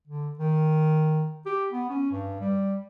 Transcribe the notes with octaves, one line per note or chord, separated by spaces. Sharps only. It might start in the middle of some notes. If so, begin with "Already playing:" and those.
D3
D#3
G4
B3
C#4
G2
G3